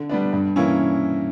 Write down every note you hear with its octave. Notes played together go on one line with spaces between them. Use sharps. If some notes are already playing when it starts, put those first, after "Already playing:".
Already playing: D3
G3 B3 D4
G2
E3 A#3 C#4 E4